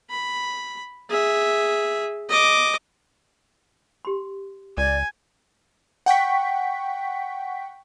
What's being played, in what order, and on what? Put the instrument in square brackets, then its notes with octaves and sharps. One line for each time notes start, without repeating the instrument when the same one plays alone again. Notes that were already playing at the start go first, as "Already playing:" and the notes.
[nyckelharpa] B5
G#4 E5
D#5 D6
[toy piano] G4 C6
[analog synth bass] C#2 [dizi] D5 [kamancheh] G#5
[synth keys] F#5 G5 C#6 B6